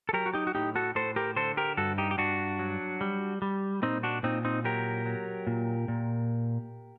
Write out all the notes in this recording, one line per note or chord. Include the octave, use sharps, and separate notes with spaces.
A4
F#3 G4 A#4
F#4
D#4 G4
F#4
A2 D#4 G4
F#4 A4
A2 A4 C5
G4 A#4
D3 A4 C5
G4 A#4
G2 F#4 A4
D#4 G4
G4
G2 D4 F#4
F#3
G3
G3
A#2 C4 D#4
D4 F#4
A#2 C4 D#4
C4 D#4
F#3 G4 A#4
F#3
A#2
A#2